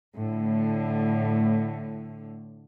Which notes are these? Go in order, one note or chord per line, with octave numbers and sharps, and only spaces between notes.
A2 D3